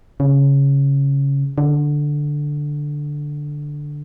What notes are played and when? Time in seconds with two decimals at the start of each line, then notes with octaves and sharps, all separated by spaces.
0.20 C#3
1.58 D3